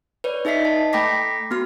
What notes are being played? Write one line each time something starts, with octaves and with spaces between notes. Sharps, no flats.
B4 C#5 D5
D#4 G#4 D#5 E5 B6 C7
D#5 A5
A3 G5 B5 D6 A#6 B6
B3 F#4 F6